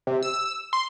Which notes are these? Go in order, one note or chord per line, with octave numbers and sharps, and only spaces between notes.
C3
E6
C6